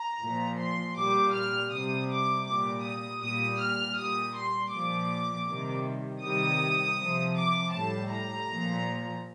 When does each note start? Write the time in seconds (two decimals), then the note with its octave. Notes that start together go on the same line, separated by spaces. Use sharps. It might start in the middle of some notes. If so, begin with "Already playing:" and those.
Already playing: A#5
0.21 A#2 F3
0.59 C6
0.96 A#2 G3 D6
1.34 F6
1.71 C3 G3 D#6
2.10 D6
2.46 A#2 G3 D6
2.84 D#6
3.22 A#2 G3 D#6
3.60 F6
3.97 A#2 G3 D#6
4.35 C6
4.72 A#2 F3 D6
5.47 C3 D#3 G3
6.22 C3 D#3 G3 D#6
6.98 C3 F3
7.36 D6
7.72 A2 G3 A5
8.10 A#5
8.49 A#2 F3